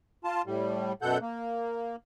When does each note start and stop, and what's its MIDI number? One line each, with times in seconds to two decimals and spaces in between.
0.24 0.42 65
0.24 0.42 81
0.46 0.93 45
0.46 0.93 55
1.02 1.18 42
1.02 1.18 47
1.02 1.18 69
1.02 1.18 78
1.02 1.18 91
1.21 1.96 58